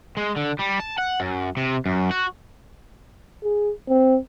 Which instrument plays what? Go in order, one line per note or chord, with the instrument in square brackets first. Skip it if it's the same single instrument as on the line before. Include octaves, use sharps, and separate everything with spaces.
[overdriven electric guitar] G#3
D3
G3
A5
F#5
F#2
C3
F#2
F#4
[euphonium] G#4
C4